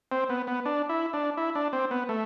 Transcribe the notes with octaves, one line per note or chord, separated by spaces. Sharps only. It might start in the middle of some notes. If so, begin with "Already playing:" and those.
C4
B3
B3
D4
E4
D4
E4
D4
C4
B3
A3